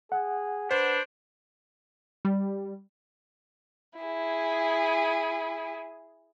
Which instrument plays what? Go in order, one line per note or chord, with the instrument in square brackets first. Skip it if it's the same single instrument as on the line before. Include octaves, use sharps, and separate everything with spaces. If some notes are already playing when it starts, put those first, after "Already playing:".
[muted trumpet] G#4 [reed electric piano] F#5
[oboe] D4 [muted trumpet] B4 [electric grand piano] C5
[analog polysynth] G3
[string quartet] E4 G#4